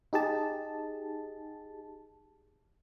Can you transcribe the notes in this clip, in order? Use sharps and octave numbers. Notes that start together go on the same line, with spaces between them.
D#4 G4 G#4 A5